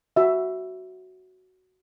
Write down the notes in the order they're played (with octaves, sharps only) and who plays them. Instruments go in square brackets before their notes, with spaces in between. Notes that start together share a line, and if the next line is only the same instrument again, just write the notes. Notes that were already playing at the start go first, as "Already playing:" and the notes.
[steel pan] F#4 E5